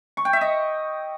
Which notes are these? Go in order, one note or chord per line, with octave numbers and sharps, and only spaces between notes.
C#6
G5
E5
D#5